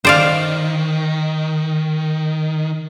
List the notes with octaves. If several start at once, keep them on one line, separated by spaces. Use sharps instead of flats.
D#3 C5 D5 F5